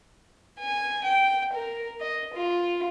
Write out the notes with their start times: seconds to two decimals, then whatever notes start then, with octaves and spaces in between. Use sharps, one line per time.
0.60 G#5
1.04 G5
1.54 A#4
2.00 D#5
2.34 F4